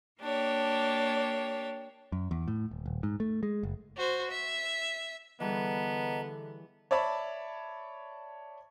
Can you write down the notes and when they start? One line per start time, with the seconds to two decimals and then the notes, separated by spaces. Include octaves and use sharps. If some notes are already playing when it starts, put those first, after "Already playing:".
0.20 A#3 D4 G4 C#5
2.12 F#2
2.31 E2
2.48 A2
2.71 D#1
2.86 D#1
3.03 G#2
3.20 A3
3.43 G#3
3.63 F#1
3.97 F#4 C5
4.31 E5
5.40 D3 E3 G3 B3 G#4 D#5 A5 A#5
6.91 C#5 D5 E5 A5 B5